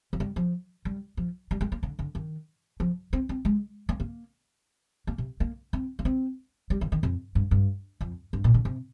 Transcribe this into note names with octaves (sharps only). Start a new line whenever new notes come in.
F3
G3
F3
G3
F3
G3
G#3
A#3
D3
D3
D#3
F3
C4
C4
G#3
A#3
A#3
A#3
C3
A#3
C4
A#3
C4
G3
D#3
D#3
F2
G2
G2
F2
G2
A#2
D3
C3